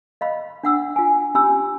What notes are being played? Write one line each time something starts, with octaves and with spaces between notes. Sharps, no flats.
D#5 F5 B5
D4 F#5 E6
F4 G#5
C#4 G4 G#5 B5 E6